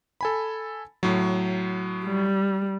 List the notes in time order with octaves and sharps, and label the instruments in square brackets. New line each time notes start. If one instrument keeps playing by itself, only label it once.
[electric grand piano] A4 G#5 B5
A2 F#3
[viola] G3